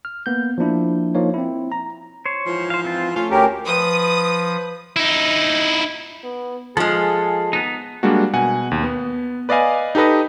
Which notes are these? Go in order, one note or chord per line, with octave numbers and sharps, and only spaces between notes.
F6
A#3 B3 G6
F3 A#3 D4 E4
F3 A#3 D#4 C#5
C4 E4
A#5
C5 C#5
G#2 E3 F3
C5 F5
C4 F4
A3 C#4 F4
D2 C#4 G4 A#4
F3 B4 D#6
D#4 E4
B3
F3 G#3 G#4 A4 F5
B3 D#4
G3 G#3 A#3 D4 F#4
B2 F#5 G#5
D#2
B3
B4 D5 D#5 F5 G#5
D#4 G4 A4 B4 D#5